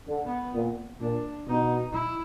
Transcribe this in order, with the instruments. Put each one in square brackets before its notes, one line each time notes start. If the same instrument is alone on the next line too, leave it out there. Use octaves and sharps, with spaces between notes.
[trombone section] D3
[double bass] B3
[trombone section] A#2
[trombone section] A#2 [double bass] D4
[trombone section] B2 [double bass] D#4
[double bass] E4